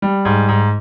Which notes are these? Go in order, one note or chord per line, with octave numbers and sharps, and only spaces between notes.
G3
G#2
G#2